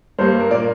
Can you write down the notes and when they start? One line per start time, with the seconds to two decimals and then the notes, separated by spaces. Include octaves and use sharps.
0.19 G2 G3 A#3 C5
0.40 A#4
0.50 A#2 D5
0.54 A#3